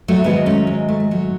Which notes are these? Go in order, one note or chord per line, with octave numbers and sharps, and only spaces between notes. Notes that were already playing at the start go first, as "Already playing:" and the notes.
F#3 A3
G#2 D#3 F#3 G#3 B3
A3 C#4
G#3
A3
G#3
F#3 A3